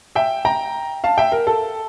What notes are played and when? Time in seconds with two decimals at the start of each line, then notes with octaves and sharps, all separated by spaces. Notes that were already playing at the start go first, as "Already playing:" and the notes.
0.15 E5 G5
0.45 G5 A#5
1.04 F5 A5
1.18 E5 G5
1.32 A#4
1.47 A4